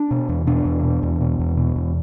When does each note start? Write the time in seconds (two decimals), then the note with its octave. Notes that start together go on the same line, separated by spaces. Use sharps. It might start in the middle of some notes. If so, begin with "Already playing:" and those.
Already playing: D4
0.11 B2
0.29 E2
0.47 B2 D4
0.65 E2
0.84 B2
1.03 E2
1.21 B2
1.39 E2
1.57 B2
1.76 E2